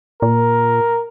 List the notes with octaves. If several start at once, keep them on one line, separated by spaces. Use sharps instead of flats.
A#2 A#4